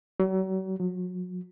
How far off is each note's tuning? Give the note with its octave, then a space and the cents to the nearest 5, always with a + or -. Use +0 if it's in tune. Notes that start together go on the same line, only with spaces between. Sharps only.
F#3 +40
F#3 -35